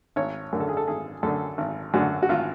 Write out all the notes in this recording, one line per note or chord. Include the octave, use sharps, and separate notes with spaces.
G#1 C#5
F#2 D3 A#4
A4
G#4
A4
G#1 G#4
F#2 D3 A4
G#1
F#2 D3 F#4
F#4
G#1 F4